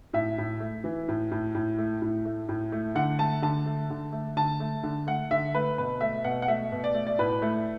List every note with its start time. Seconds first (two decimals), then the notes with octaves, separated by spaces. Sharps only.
0.13 A2 E5
0.38 A2
0.60 A3
0.84 E3
1.08 A2
1.32 A2
1.55 A2
1.79 A3
2.02 A2
2.25 A3
2.49 A2
2.72 A3
2.95 D3 F#5
3.19 A3 A5
3.42 D3 A5
3.66 A3
3.90 D3
4.13 A3
4.37 D3 A5
4.60 A3
4.83 D3
5.07 A3 F#5
5.31 D3 E5
5.54 A3 B4
5.78 B2 B4
6.01 A3 E5
6.24 B2 F#5
6.42 F#5
6.48 A3 E5
6.72 B2
6.84 D5
6.95 A3
7.07 D5
7.19 A2 B4
7.42 A3